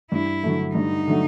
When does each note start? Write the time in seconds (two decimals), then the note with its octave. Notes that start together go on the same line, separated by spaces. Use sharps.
0.12 G2 E4
0.43 D3 F#3 A3
0.75 G2 D#4
1.08 D3 F#3 A3